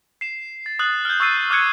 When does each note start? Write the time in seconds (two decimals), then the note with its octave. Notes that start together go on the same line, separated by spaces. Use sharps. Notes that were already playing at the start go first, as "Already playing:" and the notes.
0.21 C7 E7
0.66 A6
0.79 D#6 F#6 A6 F#7
1.05 F6 G6
1.20 C#6 D#6 E6 A6 C7 D#7
1.50 D6 F6 F#6 G#6 C#7